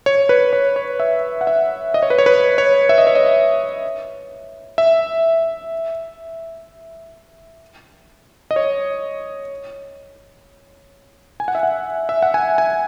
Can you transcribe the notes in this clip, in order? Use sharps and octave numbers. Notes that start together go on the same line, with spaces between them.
C#5
B4
C#5
C#5
E5
F#5
E5
D#5
C#5
B4
C#5
B4
C#5
E5
D#5
C#5
D#5
E5
D#5
C#5
G#5
F#5
E5
F#5
E5
F#5
G#5
G#5